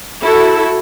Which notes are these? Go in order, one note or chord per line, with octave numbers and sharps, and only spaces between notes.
E4 F#4 A4